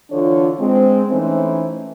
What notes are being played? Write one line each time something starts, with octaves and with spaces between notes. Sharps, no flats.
D3 E3 D4 F4 A4 C#5
G#3 C4
E3 A3 C#4 D#4 E4 C5